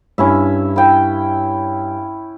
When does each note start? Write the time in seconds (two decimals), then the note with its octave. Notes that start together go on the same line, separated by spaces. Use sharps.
0.18 G2 C#4 E4 E5 G#5
0.76 E4 G5